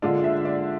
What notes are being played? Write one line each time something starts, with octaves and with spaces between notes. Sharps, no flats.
D3 G#3 D4 F4
E5
D5